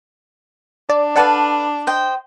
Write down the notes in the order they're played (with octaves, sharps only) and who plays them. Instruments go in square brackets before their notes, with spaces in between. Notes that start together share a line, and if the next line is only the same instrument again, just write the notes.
[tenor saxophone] D4 [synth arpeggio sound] D5
[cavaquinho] A4 B4 F5 [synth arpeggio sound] D5 F#5 A5
[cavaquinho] C5 D#5 G5